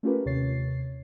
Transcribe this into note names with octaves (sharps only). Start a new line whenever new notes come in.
A3 C#4 F4 G4 A#4 B4
D#2 C3 C#5 A6 C7